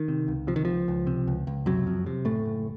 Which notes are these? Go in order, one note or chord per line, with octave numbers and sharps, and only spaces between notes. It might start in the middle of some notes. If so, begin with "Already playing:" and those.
Already playing: D#3
C3
C#2
C3 F3
D#3
C#2 F3
C#2
C3
C#2
C#2
F#2 C3 F#3
F2
C3
F#1 A2 A3
F#1